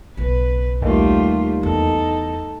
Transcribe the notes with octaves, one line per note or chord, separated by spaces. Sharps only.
B1 C#3 B4
D#2 G3 A3 F4
E2 D#4 A4